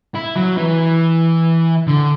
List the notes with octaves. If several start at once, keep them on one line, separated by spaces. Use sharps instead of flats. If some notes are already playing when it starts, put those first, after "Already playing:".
E4
F#3
E3
D3